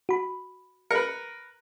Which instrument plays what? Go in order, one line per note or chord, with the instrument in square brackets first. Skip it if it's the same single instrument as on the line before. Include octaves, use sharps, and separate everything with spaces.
[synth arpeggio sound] F#4 B5
[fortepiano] A#4 B4 [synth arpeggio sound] C#7